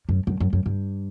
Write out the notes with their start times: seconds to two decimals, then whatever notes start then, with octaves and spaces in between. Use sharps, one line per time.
0.09 F#2
0.27 F#2
0.40 F#2
0.53 F#2
0.66 G2